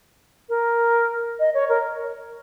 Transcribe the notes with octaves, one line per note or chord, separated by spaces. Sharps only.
A#4
D#5
C#5
A#4